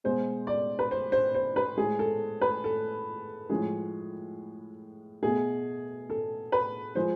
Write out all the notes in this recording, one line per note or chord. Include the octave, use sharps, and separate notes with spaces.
B2 G#3 C5
D5
B4
C5
C5
C5
B4
A2 G#3 G#4
A4
B4
A4
A2 F3 G#3 G#4
B2 A3 G#4
A4
B4
F3 G#3 C5